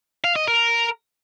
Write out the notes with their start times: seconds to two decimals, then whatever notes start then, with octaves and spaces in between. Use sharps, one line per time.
0.24 F5
0.36 D#5
0.48 A#4